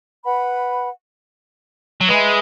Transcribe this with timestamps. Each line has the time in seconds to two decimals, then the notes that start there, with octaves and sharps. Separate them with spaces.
0.24 B4 F#5 B5
2.01 F#3
2.08 G#3 B4 E5 G#5